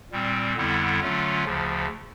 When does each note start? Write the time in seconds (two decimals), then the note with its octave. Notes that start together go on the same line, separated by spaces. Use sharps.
0.12 A#2 G3 C4
0.56 F2 D3 G3 B3 E4
1.00 D3 F#3 A3 C#4 F4
1.44 D2 C#3 F3